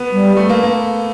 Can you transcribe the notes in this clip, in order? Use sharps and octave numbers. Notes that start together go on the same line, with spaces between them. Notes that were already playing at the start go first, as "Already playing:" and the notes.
Already playing: B3
G3
A3
A#3
A#3